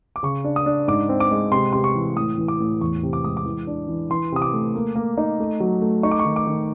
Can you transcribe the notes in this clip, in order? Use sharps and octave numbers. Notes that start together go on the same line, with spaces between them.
D6
C#3 C#6
D4
D#6
D4
G#2 D6
C4
D6
G#3
C3 C6
C3 C6
C#6
E3
A2 D#6
E3
D6
A2
E2 C#6
C3
D6
G#3 D#6
D6
E3
D4
E3
E3 C6
C3 D#6
D6
A3
A#3
A#3
D#4
A3
F#3
A3
D#4 C#6
D6
C#6
D#3
D6
D#3